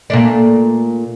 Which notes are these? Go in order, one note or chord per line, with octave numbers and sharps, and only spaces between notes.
A#2 A3 D4